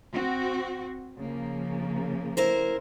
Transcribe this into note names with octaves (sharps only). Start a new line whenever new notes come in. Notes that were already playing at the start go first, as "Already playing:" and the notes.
C4 F#4
C#3 F3 A#3
E4 A#4 C5